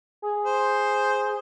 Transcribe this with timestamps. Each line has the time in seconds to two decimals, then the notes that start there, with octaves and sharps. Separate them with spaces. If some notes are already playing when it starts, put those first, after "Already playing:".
0.22 G#4
0.45 C5